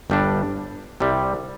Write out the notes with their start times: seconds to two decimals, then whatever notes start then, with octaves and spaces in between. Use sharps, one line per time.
0.10 G1 G2 G3 D4
1.00 C2 C3 G3